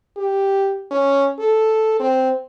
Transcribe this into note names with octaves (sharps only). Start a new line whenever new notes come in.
G4
C#4
A4
C4